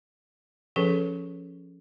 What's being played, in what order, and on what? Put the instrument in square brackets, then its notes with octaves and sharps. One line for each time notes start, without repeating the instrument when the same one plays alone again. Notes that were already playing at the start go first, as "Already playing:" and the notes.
[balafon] F3 C#4 G#4 A4 B4